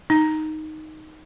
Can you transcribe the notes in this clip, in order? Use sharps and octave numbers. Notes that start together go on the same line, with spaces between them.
D#4